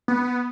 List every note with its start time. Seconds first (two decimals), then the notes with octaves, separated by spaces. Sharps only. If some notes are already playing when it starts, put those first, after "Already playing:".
0.08 B3